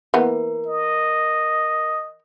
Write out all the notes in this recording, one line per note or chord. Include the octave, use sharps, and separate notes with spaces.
E3 A#3 B3 A#4
D#5